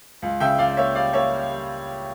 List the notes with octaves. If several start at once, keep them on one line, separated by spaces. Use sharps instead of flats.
C#2
C#3 E5 G5
C#2 D5 F5
A#3 C#5 E5
G3 D5 F5
A#3 C#5 E5
G3
G3